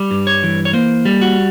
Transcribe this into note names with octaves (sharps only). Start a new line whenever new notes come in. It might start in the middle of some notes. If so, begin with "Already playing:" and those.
Already playing: G3
G2
C#5
E3
C#5
A#3 C5
G3
F#4